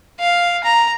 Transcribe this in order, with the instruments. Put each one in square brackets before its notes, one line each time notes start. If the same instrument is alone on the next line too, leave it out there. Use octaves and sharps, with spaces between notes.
[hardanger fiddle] F5
A#5